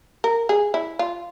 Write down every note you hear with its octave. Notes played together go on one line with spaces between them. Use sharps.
A#4
G#4
E4
F4